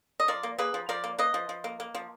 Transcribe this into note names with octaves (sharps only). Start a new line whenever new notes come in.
D#5
F3 A#4 D5
A#3
A#3 G#4 B4
F3
F3 A#4 D5
A#3
A#3 B4 D#5
F3
F3
A#3
A#3
F3